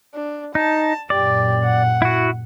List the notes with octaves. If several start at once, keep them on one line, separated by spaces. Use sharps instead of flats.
D4
D#4 A5
F#2 A#2 G4 D5
F#5
E4 F#4